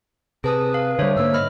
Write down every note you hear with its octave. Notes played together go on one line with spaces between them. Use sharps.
C3 G#4 B4 A5 D#6
F5
D3 G3 C5 C#5 E5
G#2 D3 A#3 E6
D#5 B5 F6